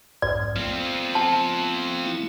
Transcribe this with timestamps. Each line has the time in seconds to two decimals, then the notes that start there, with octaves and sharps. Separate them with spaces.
0.22 B1 F2 G#2 D5
0.56 F3 A3 B3 C4
1.15 A5
2.07 A3 E4